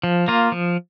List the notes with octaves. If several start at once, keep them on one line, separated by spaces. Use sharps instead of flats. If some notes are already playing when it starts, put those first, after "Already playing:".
F3
A#3 F4
F3